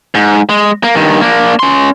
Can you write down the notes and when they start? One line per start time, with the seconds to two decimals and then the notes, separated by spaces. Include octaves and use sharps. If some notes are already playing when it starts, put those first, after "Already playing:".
0.15 G#2
0.49 G#3
0.83 A#3
0.95 G2 D#3
1.21 A#3 D4
1.59 C#4 C6